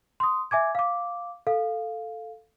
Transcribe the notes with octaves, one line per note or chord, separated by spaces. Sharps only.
C6 D#6
E5 G#5 D6 G#6
F5 D6
A4 F5